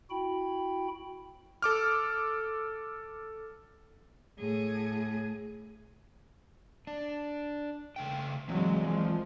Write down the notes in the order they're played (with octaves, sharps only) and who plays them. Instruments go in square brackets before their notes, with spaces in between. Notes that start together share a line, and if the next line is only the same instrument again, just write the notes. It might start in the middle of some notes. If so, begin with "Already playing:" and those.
[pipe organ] E4 F#4 G5 B5
[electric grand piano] A4 D6 F6
[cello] A2 G#4
[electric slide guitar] D4
C#3 A3 G5
[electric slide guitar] E3 A#3 C4 [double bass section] F#3 G#3
[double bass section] F3